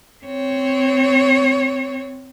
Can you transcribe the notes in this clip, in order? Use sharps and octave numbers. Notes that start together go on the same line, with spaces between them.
C4 C#5